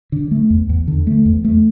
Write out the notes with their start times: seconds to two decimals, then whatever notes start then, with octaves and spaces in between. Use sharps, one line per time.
0.12 D3
0.31 A3
0.50 E2
0.69 E2
0.88 D3
1.07 A3
1.26 E2
1.44 A3